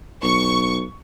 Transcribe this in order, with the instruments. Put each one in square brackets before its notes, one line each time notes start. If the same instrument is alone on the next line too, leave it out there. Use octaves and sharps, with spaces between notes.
[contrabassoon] B1 [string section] C#6